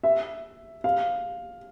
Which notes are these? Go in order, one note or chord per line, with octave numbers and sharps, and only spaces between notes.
E5
F5